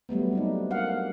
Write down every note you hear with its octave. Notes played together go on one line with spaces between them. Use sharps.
F#3 G3 A3 B3
C4 D4 D#4
A#3 F5 F#5